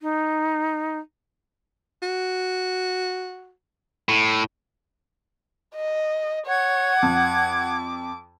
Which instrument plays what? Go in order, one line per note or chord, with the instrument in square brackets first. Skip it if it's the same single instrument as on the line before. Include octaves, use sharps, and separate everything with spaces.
[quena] D#4
[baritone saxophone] F#4
[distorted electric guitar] A2
[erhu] D#5
[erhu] C#5 [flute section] F#5 G#6
[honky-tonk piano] F2 [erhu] D6